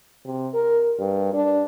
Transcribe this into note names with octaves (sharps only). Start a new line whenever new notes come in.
C3
A#4
G2
D4